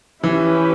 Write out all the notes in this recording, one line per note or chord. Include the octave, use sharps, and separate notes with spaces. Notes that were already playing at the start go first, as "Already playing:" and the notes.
E3 C#4 E4 G4 B4